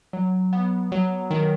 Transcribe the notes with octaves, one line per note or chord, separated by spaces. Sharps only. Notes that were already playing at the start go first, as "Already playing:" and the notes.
F#3
B3
F#3
D#3